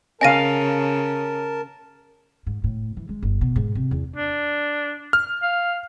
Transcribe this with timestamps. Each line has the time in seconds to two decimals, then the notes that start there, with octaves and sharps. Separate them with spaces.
0.21 C#3 A#4 D#5 F5 G#5 A5 A#6 D#7
2.46 G#2
2.64 A2
2.97 E3
3.09 G#3
3.22 G1
3.41 B2
3.56 G#2
3.75 C3
3.91 E2
4.16 D4
5.13 F6
5.42 F5